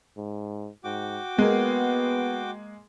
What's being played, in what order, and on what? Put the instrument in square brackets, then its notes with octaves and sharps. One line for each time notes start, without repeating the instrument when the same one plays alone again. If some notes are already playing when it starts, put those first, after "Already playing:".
[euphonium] G#2
[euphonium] G#2 [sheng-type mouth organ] F#4 G5 D6
[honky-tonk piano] G#3 A#3 [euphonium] B3